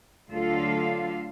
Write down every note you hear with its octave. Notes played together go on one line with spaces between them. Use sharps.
D2 D3 F#3 F4 A4 F5